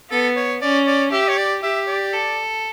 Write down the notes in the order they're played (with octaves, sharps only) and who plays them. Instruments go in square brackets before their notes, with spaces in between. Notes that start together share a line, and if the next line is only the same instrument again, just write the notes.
[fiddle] B3 [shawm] A4
[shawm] C#5
[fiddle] C#4 [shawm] D5
[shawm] D5
[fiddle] G4 [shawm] E5
[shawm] C#5
D5
[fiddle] G4 [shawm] E5
[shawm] D5
[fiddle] A4